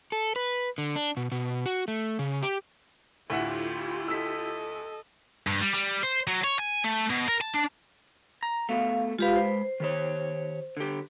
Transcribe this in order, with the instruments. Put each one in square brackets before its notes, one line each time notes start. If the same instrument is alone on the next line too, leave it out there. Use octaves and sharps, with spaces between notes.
[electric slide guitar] A4
B4
D3
D4
B2
B2
F#4
A3
C#3
G4
[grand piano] D2 E5 F#5 [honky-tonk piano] A2 [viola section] E4 F4 G4
[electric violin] A4 D#5 [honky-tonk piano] E6 B6
[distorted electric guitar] G2
G3
G3
C5
F#3
C#5
G#5
A3
B2
A#4
A5
D4
[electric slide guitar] A#5
[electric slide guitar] A3 B3 F#4 [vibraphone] F5
[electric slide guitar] G#3 B4 [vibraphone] F4 G4 F5
[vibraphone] C5
[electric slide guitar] D#3 G4 C#5
D3 G4